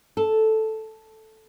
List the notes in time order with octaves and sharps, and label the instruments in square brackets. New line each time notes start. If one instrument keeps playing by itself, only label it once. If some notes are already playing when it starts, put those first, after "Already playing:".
[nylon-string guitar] A4